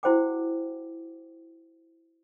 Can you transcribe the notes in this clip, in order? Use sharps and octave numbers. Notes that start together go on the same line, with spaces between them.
E4 F#4 C5 F#5 G5 D6